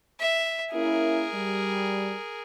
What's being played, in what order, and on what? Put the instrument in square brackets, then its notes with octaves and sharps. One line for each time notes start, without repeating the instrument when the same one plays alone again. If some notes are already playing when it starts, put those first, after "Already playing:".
[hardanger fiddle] E5
[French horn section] A#3 C#4 E4 [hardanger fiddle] G#4 A#4
[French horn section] G3